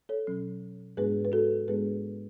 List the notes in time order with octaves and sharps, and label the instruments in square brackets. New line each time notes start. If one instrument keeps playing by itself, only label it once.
[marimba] A4 C#5
B2 F#3 C#4
G#2 G#3 B3 D4 G#4 B4
B4
F#4 A4
G#2 G#3 B3 D4 G#4 B4